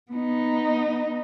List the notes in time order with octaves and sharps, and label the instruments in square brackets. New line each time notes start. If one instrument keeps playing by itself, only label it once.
[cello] B3 D#4